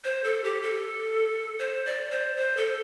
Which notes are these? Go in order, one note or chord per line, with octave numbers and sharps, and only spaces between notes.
C5
A4
G4
A4
C5
D5
C5
C5
A4